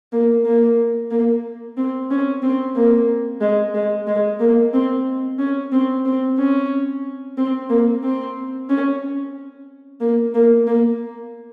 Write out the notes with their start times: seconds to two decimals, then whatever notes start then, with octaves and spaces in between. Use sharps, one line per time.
0.13 A#3
0.45 A#3
1.11 A#3
1.77 C4
2.10 C#4
2.43 C4
2.76 A#3
3.41 G#3
3.74 G#3
4.07 G#3
4.40 A#3
4.74 C4
5.39 C#4
5.72 C4
6.06 C4
6.38 C#4
7.37 C4
7.70 A#3
8.03 C4
8.70 C#4
10.00 A#3
10.34 A#3
10.67 A#3